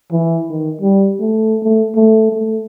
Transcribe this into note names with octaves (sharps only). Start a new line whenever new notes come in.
E3
D#3
G3
A3
A3
A3
A3